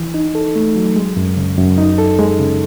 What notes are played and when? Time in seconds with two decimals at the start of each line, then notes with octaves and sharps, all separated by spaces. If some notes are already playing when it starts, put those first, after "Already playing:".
Already playing: E3
0.14 D#4
0.35 A4
0.56 A3
0.76 F#3
0.96 G#3
1.17 F#2
1.37 C#3
1.58 F#2
1.78 D#4
1.98 A4
2.19 G#3
2.39 C#3